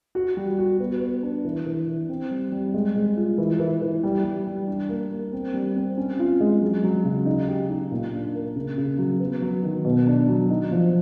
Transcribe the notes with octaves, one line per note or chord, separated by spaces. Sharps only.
F#4
G3
F#4
B3
B3
D4
E3
E3
E3
C4
G3
G3
G#3
G#3
F4
E3
E3
E3
G3
G3
G3
D4
A#3
A#3
C4
G3
C4
C#4
F4
G#3
F#3
F#3
C#3
D#4
G4
D#4
A#2
D4
A#3
C#3
C#3
F#3
B3
F#3
D#3
B2
D4
F#3
D#4
F3